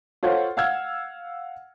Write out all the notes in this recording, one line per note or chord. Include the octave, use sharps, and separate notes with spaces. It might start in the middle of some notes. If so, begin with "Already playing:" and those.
F4 A4 C5 C#5 F#5
F5 F#5 E6 F6 G#6